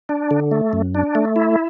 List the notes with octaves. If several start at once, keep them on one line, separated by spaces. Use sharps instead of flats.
D4
D3
A3
F#2
D4
A3
E4